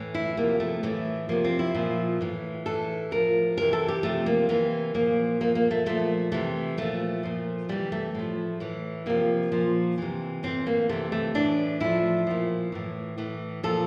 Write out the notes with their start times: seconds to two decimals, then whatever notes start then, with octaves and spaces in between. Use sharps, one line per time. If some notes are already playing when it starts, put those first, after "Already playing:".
Already playing: A2 E3
0.14 E4
0.37 C3 F3 A#3
0.60 A3
0.83 A2 E3 A3
1.29 C3 F3 A#3
1.44 C4
1.59 E4
1.75 A#2 F3
2.21 A2 E3
2.66 A2 E3 A4
3.11 A2 F3 A#4
3.57 C3 E3 A#4
3.73 A4
3.88 G4
4.03 C3 F3 A3
4.26 A#3
4.49 C3 E3 A#3
4.94 A#2 F3 A#3
5.40 A#2 F3 A#3
5.55 A#3
5.71 A3
5.86 A#2 F3 A3
6.32 C3 E3 A3
6.78 A#2 F3 A3
7.23 A#2 F3
7.69 C3 E3 G3
7.92 A3
8.15 A2 F3
8.60 A2 E3
9.06 C3 F3 A#3
9.52 A#2 F3
9.98 C3 E3
10.43 A2 E3 C4
10.66 A#3
10.89 C3 E3 A3
11.12 A3
11.34 A2 E3 D4
11.80 A2 F3 E4
12.27 A#2 F3
12.72 A2 E3
13.18 A2 E3
13.63 A#2 F3 A4